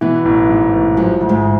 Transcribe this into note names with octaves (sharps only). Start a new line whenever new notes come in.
B2 E3 B3
A1
G#2
A1
F#2 F3 F#3
D2
G#2 G#3